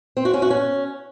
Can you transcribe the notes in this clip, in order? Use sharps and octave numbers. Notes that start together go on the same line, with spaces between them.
C4
F#4
C#4
F#4
C#4